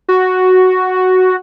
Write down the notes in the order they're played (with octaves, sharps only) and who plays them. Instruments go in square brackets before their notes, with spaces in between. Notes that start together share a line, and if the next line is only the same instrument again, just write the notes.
[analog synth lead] F#4